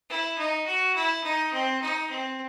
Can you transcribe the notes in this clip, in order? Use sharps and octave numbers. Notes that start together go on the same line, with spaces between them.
E4
D#4
F#4
E4
D#4
C4
D#4
C4